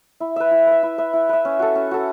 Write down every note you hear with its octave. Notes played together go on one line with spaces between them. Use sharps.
E4
B4 E5
E4
B4 E5
E4
B4 E5
E4
B4 E5
C#4
F#4 A4
C#4
F#4 A4